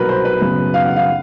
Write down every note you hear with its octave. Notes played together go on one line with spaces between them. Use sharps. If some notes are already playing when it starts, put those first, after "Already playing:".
Already playing: C2 B2 F#3 A#4 B4
C5
B4
F#2 C#3 F#3 B3
F5
F#5
F5